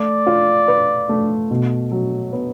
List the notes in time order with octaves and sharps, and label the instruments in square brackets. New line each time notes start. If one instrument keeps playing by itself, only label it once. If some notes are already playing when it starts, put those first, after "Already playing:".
Already playing: [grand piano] A3 [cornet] D5
[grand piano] F4
B4
A3
B2
F#3
B3